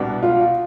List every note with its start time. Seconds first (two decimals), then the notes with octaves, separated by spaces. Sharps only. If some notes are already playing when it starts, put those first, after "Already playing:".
Already playing: C2 B2 G3 B3 D4
0.23 F4